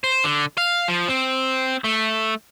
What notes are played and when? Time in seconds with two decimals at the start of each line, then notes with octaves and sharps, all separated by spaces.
0.04 C5
0.24 D3
0.58 F5
0.88 F3
1.08 C4
1.84 A3